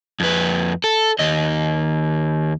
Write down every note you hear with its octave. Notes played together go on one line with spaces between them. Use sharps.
F2 B4
A4
D#2 D#5